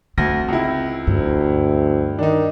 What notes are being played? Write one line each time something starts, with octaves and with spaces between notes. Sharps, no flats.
D2 C4 A#6
C#2 E4
D2 G2
D#3 D4 D#4